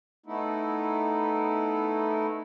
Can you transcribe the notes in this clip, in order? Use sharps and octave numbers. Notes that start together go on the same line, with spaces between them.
A3 B3 D#4 E4